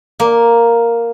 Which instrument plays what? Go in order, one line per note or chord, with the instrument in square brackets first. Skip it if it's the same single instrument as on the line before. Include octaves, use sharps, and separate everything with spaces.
[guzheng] A#3